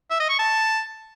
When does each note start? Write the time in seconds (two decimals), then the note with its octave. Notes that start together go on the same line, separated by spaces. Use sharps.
0.10 E5
0.20 D#5
0.29 C#6
0.39 A5